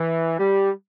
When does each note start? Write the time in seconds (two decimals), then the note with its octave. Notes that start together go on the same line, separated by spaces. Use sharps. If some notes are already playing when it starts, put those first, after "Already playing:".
Already playing: E3
0.39 G3